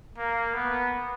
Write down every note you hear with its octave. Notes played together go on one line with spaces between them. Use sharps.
A#3
B3